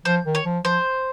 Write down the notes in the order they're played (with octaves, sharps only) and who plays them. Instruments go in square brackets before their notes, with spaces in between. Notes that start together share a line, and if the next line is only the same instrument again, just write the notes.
[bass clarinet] F3 [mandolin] C5
[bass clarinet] D#3
[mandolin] C#5
[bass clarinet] F3
[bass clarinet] F3 [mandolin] C5